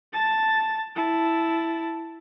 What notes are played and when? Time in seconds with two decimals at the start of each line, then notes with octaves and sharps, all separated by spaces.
0.14 A5 A6
0.96 E4 A5